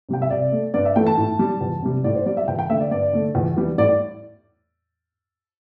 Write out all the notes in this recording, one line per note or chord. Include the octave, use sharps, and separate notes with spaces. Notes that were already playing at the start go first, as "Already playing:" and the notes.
C3 G3 G5
E5
C3 D5
A3
G2 D5
E5
E3 A3 G5
A5
A2
G3
E2
C3 G3
A2 D5
C5
G3 D5
E5
E2 G5
G5
D3 A3 E5
D5
G2 D5
D3 A3
E2
E3 G3
A2 D5